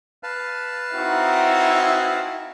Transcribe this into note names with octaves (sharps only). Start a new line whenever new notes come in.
B4 F5 A5
C4 D#4 E4 F#4